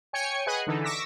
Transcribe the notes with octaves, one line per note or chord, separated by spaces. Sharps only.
C#5 G5 G#5 C#6 C#7
G#4 B4 D#5 F#5 G#5 F#6
D3 E3 D#4 A4
C#6 D6 E6 A#6 B6